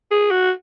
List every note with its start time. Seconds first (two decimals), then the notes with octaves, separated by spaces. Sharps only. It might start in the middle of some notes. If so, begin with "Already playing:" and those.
0.11 G#4
0.31 F#4